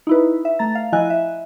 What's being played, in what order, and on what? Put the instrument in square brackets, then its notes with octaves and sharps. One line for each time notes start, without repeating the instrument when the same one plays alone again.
[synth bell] D#4 E4 B4
E5
A3 A#5 A6
F5
F3 E4 D#5 G#5 F#6
E5